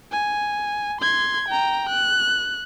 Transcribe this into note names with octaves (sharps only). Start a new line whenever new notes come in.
G#5
C6 G#6
G5 A#5
F#6